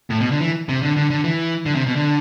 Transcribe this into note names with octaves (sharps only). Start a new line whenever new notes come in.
A2
B2
D3
E3
C3
D3
D3
D3
E3
D3
C3
B2
D3